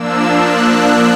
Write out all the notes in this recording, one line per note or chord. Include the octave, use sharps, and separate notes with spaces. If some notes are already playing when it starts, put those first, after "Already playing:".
Already playing: F3 A#3 D4 E6
F#6